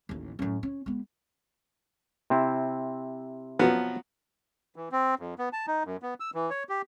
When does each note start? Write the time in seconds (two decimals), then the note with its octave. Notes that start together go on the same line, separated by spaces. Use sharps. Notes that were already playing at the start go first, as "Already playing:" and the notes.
0.09 A1 D#2
0.39 F#2 A2
0.63 C#4
0.86 G#3 B3
2.30 C3 C4 E4
3.59 F3 F#3 B3
4.76 E3
4.92 C4
5.19 F2
5.39 B3
5.53 A5
5.67 D#4
5.85 F#2
6.03 B3
6.20 E6
6.34 E3
6.50 C#5
6.69 G4